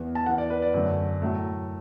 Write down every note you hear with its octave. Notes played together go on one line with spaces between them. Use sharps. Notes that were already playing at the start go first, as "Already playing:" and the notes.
Already playing: E2 E3 B3
A5
E2 E3 B3 F#5
D5
B4
D5
F#2 D3 A3
A2 F#3 A3